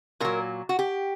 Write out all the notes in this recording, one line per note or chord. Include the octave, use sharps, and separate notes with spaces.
A#2 F#3 A#4
F#4
G4